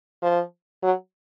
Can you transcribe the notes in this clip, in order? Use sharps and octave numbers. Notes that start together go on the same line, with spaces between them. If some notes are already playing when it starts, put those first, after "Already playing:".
F3
F#3